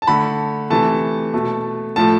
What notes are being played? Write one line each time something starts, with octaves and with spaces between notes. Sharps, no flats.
A5
D3 A3 B5
C3 E3 A3 A5
B2 A3
A2 F3 A3 A5